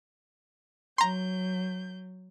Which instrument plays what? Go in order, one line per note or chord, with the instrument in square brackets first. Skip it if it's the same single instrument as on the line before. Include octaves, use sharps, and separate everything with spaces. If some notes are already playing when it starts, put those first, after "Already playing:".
[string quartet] F#3 G6 [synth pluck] A#5 C6